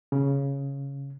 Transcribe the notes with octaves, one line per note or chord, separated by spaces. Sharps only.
C#3